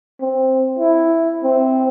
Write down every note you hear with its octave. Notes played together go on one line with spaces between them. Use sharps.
C4
E4
C4